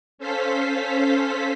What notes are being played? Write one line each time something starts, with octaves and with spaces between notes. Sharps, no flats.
C#4 A4 C5 F5 B6